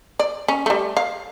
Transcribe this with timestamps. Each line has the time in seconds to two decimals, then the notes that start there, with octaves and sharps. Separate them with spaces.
0.19 D5
0.48 C#4
0.66 G3 A3
0.97 F5